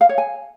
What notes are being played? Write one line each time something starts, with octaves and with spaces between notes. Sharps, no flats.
F5
C#5
G#5